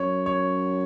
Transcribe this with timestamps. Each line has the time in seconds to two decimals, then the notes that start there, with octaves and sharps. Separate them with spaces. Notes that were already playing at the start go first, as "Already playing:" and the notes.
Already playing: F#2 C#5
0.26 C#5